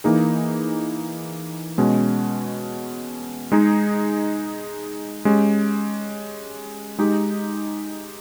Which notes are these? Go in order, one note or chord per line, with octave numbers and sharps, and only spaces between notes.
E3 A#3 D#4 G#4
B2 G#3 C#4
G#3 D#4 G#4
G#3 C#4 G4
G#3 D#4 G4